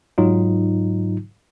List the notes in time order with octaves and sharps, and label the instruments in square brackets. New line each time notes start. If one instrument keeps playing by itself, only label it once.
[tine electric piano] G#2 F#3 D#4 F4